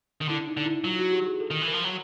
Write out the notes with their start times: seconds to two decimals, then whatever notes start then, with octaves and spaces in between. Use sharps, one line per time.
0.21 D#3
0.29 D3 E4
0.47 D#4
0.57 D3
0.66 E4
0.84 F#3 F4
0.99 F#4
1.12 G4
1.27 G#4
1.40 A4
1.51 D#3
1.61 E3
1.68 A#4
1.73 F3
1.84 F#3